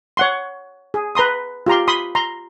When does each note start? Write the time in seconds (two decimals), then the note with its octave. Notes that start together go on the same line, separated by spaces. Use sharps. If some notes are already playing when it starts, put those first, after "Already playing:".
0.17 C#5 F#5 C6
0.94 G#4
1.15 B4 A#5 C6 D#6
1.67 F4 G4 A#5 C6
1.88 B5 C6 D#6
2.15 A#5 C6